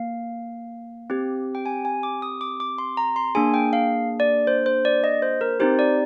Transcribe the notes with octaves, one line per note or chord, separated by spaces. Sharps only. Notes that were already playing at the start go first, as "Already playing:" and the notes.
Already playing: A#3 F5
C4 G4
G5
G#5
G#5
D6
D#6
D6
D6
C6
A#5
C6
A#3 D4 G#4 G#5
G5
F5
D5
C5
C5
D5
D#5
C5
A#4
C4 D#4 G4 C5
D5